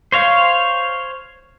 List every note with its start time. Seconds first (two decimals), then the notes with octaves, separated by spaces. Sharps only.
0.12 C5 C#5 F5